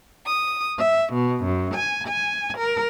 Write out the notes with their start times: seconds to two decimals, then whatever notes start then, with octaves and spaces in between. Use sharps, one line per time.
0.26 D#6
0.78 E5
1.13 B2
1.43 F#2
1.74 G#5
2.06 G#5
2.58 A#4